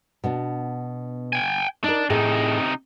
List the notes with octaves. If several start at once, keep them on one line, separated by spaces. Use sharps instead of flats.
B2 B3 D4
G5 G#5
D4 D#4 A#4
A2 C3 D#4 G#4 G#5